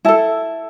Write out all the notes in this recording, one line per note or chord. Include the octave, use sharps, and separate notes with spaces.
E4 A4 A5